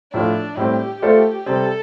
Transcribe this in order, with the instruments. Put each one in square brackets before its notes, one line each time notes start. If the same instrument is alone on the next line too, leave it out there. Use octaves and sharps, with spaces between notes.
[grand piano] A2 F3 A3 F4 [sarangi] D4
[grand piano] A2 G3 C4 [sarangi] G4
[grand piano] A3 F4 A4 C5
[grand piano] C3 G3 C4 [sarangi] A4